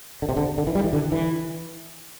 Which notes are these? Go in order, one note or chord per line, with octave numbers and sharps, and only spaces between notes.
D3
C3
D3
D3
E3
G3
E3
D3
E3